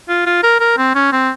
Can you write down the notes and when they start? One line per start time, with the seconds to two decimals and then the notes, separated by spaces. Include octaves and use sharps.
0.09 F4
0.26 F4
0.43 A#4
0.60 A#4
0.78 C4
0.95 C#4
1.12 C4